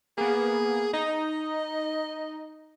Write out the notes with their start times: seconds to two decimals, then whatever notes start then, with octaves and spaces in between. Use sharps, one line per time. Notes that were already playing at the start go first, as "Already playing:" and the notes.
0.18 A#3 B3 G#4
0.94 D#4 D#5